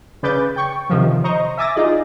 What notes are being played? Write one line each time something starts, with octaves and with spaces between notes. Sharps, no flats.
C#3 B4 D5 G6 A6
G5 C#6
C3 D#3 F3
C5 D#5 A#5 C#6
E5 G#5 D6 A6 A#6
D#4 F4 G#4 D5 D#5